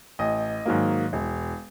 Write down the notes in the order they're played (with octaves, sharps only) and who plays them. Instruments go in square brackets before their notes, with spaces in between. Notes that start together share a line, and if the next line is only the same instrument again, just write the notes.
[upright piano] A1 D#5
G#2 D#3 F#3 A#3
E1